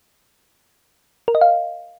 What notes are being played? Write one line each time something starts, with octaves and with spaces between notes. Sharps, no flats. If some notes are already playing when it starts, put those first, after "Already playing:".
A#4
D#5
F5